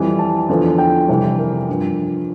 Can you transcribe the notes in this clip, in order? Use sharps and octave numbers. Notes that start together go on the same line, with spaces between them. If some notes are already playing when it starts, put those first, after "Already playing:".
Already playing: F2 E3 G3
A5
E2 D3 F3
G5
F2 C3 E3 G3
A#4
G2 F3